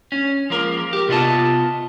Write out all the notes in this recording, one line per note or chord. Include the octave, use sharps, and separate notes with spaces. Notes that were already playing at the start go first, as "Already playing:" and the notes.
C#4
F3 G#3 A#3 A#4
G4 A#4
C3 B3 F4 B4 D#5 A5